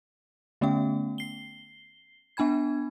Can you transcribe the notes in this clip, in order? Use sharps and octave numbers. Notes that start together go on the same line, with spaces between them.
D3 A3 B3 C#4 G5
C7 G7
B3 D4 G#5 B5 G#6